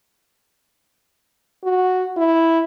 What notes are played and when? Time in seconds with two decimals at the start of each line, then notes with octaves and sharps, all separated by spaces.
1.64 F#4
2.17 E4